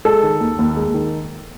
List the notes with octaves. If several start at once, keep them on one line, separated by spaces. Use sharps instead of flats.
G#3 A4
D#3
D#2
D#2
G#3
D#3